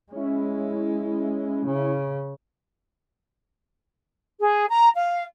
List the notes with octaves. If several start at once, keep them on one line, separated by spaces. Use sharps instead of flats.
G#3 C#4 E4
C#3
G#4
A#5
F5